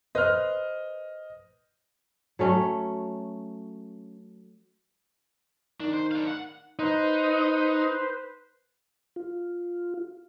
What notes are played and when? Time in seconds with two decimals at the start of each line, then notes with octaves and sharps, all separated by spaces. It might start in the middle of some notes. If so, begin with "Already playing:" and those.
0.15 B4 C5 D#5 F6
2.39 F#3 A3 C#4
5.80 D#3 D4
5.93 C5
6.12 D4 F5
6.27 F#5
6.79 D#4 B4 C5
9.16 F4